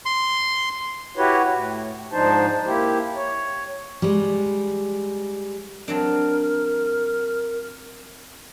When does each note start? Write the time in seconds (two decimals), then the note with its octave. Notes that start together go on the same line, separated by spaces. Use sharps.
0.06 C6
1.17 E4 F#4 G4 B4 C#5
1.52 A2
2.12 G#2 F3 D4 D#4 C5 A5
2.66 A#3 E4 G4
3.16 C#5
4.02 G3 G#3
5.88 F#3 C4 D4 A#4